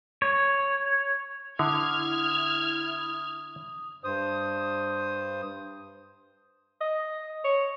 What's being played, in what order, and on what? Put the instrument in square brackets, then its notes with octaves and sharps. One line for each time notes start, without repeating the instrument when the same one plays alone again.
[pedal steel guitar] C#5
[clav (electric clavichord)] D3 [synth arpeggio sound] E4 [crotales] D#6 [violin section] F6 G#6
[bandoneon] G2 C5 D#6
[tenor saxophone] D#5
C#5